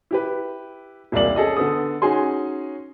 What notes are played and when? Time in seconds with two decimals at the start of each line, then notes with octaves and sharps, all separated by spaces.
0.11 E4 G4 B4
1.12 E1 C2 A#3 D5 F#7
1.36 C#4 G#4 A4 D#5
1.57 D3 B3 A4 D#6
2.02 C#4 D#4 F#4 G#4 G#5 C6